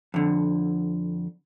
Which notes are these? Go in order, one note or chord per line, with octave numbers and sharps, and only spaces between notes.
F2 D3